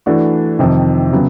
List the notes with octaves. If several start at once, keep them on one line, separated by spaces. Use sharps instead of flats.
E3 A3 D4 F#4
F2 C3 D#3
C#3 F#3 B3